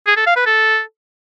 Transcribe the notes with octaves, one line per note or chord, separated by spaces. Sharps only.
G#4
A4
F5
B4
A4